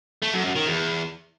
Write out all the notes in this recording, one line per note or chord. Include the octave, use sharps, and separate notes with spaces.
A3
F#2
F#2
D#3
E2